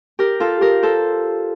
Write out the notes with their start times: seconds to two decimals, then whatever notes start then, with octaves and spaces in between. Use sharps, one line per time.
0.19 G4 A#4
0.40 F4 A4
0.61 G4 A#4
0.83 A4 C5